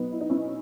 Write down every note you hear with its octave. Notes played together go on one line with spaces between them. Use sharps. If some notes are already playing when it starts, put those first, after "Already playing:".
Already playing: B2 F#3 B3 D#4
E4
D#4
C#4 E4